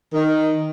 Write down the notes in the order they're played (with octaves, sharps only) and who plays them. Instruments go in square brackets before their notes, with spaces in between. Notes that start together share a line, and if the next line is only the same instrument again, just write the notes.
[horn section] D#3